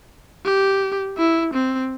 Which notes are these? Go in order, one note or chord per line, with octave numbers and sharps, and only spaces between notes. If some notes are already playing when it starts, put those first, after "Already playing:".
G4
E4
C4